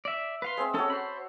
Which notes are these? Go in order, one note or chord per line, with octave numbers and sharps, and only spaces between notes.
D5 E5
B4 F5 C6
G#3 C4 E5
C#4 F#4 A4 C#5 A5
C5 B5